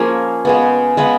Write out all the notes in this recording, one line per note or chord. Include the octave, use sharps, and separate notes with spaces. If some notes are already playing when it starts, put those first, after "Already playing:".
Already playing: F3 A#3 C#4 G#4 A#4
C#3 G#3 B3
C#3 G#3 B3 B4